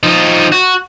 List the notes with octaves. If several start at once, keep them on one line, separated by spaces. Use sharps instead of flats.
F3 D#4
F#4